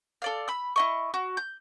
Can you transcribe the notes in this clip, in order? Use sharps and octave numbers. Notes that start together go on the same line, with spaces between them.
A4 D5 F5
B5 E6
E4 D#5 C#6
F#4
G6